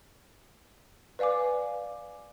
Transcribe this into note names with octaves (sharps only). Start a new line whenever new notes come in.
B4 D5 F5 G#5 D6